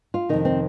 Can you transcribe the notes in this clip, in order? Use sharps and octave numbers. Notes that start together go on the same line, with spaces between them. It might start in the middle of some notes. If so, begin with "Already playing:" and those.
F4
F2 C3 D#3 D#4
C4